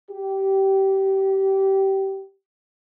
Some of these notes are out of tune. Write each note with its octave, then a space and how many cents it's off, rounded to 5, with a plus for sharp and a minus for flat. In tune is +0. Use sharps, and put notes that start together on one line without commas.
G4 -20